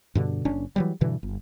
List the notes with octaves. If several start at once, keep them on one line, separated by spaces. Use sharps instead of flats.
G2 B2 D3
F#1 C#4 D4
E3 F#3 G3
G2 B2 D3 E3
G1